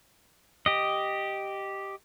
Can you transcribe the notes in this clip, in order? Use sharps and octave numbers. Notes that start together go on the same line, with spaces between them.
G4 D#5